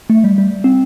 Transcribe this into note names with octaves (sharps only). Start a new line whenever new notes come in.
A3
G3
G3
C4